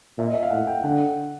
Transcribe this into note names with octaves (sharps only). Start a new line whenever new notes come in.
A#2 E5
D#5
E5
F5
A2 F#5
G5
D3 F#5